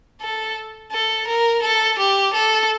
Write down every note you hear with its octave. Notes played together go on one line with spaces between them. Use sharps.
A4
A4
A#4
A4
G4
A4